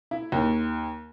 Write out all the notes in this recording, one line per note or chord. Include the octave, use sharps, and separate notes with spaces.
E4
D#2